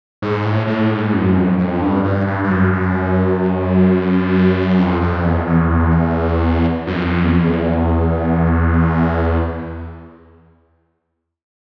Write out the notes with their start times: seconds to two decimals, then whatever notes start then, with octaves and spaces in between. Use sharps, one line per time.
0.22 G#2
0.45 A2
0.67 A2
0.91 G#2
1.14 F#2
1.36 F2
1.59 F2
1.82 G2
2.05 G2
2.27 G2
2.44 G2
2.50 F#2
2.73 F#2
4.78 F2
5.02 F2
5.24 E2
5.47 E2
5.70 E2
6.87 F#2
6.92 F2
7.21 E2
7.32 F2
7.41 E2